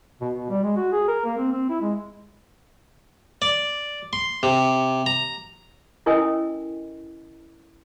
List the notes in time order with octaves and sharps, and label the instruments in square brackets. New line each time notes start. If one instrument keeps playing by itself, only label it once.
[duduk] B2
B2
G3
G#3
F#4
G#4
A#4
A#3
C4
C4
E4
G#3
[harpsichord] D5
C6
C3
A#5
[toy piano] C#4 E4 A4 A#4 D#5 G#5